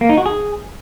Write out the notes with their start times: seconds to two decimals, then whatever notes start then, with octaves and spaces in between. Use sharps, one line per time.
0.01 A#3
0.09 D#4
0.17 F#4
0.26 G#4